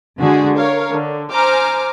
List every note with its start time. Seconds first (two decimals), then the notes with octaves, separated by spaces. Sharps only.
0.19 D3 G#3 F#4 G#4
0.57 A#4 C#5 F5
0.93 D3
1.32 C5 G#5 A#5 D6 F6